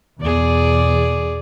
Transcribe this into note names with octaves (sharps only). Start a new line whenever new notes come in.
E2 B2 G#4 D5